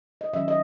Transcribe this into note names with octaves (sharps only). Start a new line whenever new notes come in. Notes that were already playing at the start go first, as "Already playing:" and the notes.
D#5
D#3 F#3 C#4 E5
D#5